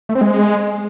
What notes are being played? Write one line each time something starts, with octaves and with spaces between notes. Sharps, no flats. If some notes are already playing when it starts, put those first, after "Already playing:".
A3
C4
G#3